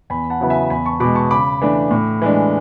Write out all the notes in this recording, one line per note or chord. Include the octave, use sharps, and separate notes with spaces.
E2 G#5 B5
F#5 A5
C#3 F#3 B3 E4
E5 G#5
E2 G#5 B5
A5 C#6
B2 G#3 B5 D6
A5 C#6
C#3 B5 D6
E3 A3 D4
A2
E3 G#3 D4